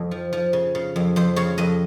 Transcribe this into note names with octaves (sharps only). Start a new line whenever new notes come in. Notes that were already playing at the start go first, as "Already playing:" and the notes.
Already playing: F2
F3
F3
C#3
C#3
F2
F2 C5
C#3 C#5
F2 D#5